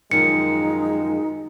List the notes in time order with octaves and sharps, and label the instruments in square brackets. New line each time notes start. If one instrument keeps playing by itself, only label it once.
[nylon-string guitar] F#2 D#3 F3 [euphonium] G#3 [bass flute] D#4 [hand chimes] C#7